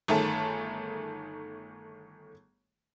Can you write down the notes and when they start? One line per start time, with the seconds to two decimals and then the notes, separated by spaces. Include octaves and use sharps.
0.08 G1 D#3 A3 G#4 A5